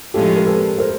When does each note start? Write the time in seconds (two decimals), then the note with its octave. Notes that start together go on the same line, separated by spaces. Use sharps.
0.14 A2 F3 G#3 C#4 F4 G4 A4
0.36 A#4
0.46 A4 B4
0.78 A#4 C5